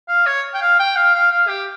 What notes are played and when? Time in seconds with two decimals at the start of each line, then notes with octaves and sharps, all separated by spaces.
0.09 F5
0.27 C#5
0.54 G5
0.62 F5
0.79 G5
0.96 F5
1.15 F5
1.31 F5
1.48 G4